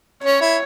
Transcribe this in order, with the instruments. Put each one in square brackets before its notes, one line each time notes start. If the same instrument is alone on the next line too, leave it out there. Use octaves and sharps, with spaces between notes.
[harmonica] C#4 [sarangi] C#5
[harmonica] E4